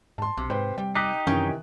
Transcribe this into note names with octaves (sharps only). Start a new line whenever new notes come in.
G#2 A5 C6
B1 C3
G#2 B4 C5 G5
G3 G5
D#4 G4 D#5 D6 D#6 F#6
F#2 C3 D#3 E3 C#4 G5 G#5